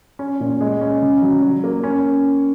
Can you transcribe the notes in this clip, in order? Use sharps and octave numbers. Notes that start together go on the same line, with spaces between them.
C#4
A#2
G#3
C#4
C#3
F#3
F#3
A#3
C#4